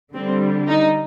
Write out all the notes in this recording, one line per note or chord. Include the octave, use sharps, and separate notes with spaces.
D3 G3 C4
D#4